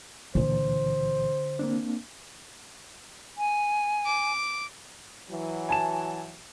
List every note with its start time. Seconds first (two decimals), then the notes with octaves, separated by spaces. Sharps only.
0.35 C#2 A#2 D3 E3 C5
1.59 A#3 C4 D4
3.38 G#5
4.05 D6
5.30 E3 F#3
5.69 G#5 A5 E7